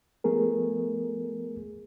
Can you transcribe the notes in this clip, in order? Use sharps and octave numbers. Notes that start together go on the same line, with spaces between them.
F3 A3 B3 G#4 A#4